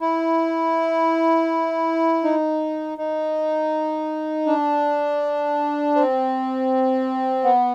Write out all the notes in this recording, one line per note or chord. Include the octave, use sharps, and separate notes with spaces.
E4
D#4
D#4
D4
C4
B3